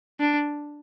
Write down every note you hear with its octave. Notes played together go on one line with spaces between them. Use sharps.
D4